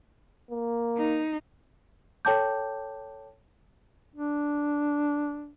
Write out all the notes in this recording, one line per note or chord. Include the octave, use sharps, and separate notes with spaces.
A#3
D#4
A4 C#5 G5 A5 D6 G6
D4